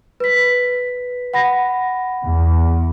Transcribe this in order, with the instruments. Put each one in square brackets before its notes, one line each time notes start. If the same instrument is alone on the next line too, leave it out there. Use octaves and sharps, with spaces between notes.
[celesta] B4 B6
F#5 B5 A#6
[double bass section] E2